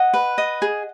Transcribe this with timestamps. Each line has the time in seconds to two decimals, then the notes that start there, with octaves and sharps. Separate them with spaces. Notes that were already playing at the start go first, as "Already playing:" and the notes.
Already playing: D#5 F#5
0.14 B4
0.38 D#5
0.62 G#4